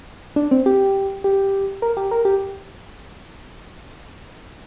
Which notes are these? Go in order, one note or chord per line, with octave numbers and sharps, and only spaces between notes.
D4
C4
G4
G4
A#4
G4
A#4
G4